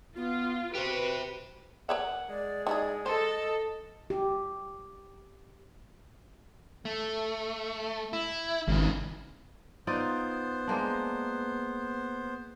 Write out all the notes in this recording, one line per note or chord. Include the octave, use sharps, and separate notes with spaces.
B3 F4
F#4 G4 B4 C5
A#4 C#5 E5 F#5
G#3 D5
D#4 E4 G#4 D5
A4 C5 D#5
G4
A3
E4
G#1 C#3 E3
B3 D#4 F4 C5 D5
G#3 A#3 D4